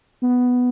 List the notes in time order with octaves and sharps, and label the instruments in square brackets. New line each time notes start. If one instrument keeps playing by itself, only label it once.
[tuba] B3